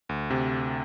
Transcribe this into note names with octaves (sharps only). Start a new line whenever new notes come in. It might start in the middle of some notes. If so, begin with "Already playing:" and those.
D2
C3